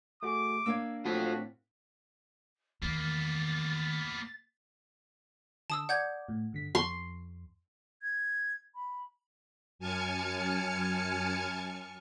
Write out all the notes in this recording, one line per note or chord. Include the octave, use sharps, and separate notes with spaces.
A3 F#4 G#4 D6
A#3 D4 F5 E6 G#6
A2 C4 F4 F#4 A4 B6
E2 D#3 A#3 B3 A6
D3 A5 D#6 E6
D5 F#5 G6 G#6
A2
G2 D3 B6
F2 C6 C#6
G#6
B5
F#2 G#5 A5 F6 G#6 C#7